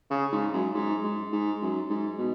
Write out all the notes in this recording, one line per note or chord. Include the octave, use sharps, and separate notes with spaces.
C#3
G#2
F#2
G#2
G#2
G#2
F#2
G#2
B2